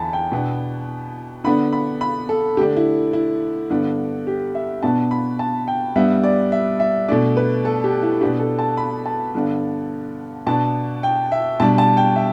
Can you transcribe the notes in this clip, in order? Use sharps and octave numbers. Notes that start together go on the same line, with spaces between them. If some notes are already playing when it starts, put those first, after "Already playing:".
Already playing: E2 D3 A5 B5
G5
B2 B3 D4
D3 B3 D4 B5
B5
B5
A4
D3 A3 D4 G4
E4
E4
G2 D3 B3 D4
G4
E5
B2 B3 D4 A5
B5
A5
G5
G2 G3 B3 E5
D5
E5
E5
B2 A3 D4 D5
B4
A4
G4
E4
B2 B3 D4 G4
A4
A5
B5
A5
G2 D3 B3 D4
B2 B3 D4 A5
G5
E5
B2 G3 D4 A5
A5
G5
E5